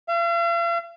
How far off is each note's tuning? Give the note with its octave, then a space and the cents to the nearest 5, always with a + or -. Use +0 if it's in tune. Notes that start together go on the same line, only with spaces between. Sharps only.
F5 -45